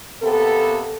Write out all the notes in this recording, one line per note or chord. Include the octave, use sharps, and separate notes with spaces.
C3 A#3 B3 A4